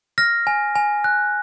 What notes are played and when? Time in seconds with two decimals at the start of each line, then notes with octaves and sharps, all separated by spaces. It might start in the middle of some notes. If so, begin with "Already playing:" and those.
0.18 F6 A#6
0.47 G#5
0.75 G#5
1.04 F#6